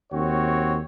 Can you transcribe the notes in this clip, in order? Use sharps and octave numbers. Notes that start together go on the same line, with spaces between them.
D#2 C4 F#4 C#5